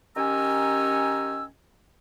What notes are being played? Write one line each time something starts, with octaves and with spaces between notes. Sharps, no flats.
D#3 C#4 G4 G#5 A#5 E6